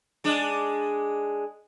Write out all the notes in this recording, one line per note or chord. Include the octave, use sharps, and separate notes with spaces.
G#3 D4